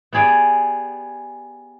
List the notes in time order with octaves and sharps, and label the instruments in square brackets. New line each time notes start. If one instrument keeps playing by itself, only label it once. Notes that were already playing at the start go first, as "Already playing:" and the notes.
[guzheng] B3 G4 G#4 D5